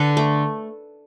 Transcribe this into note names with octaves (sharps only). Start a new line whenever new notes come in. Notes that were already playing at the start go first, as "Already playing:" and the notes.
Already playing: D3 A4 B4
A3